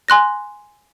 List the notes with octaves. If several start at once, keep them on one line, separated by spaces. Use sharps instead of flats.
G#5 C6 F#6 A#6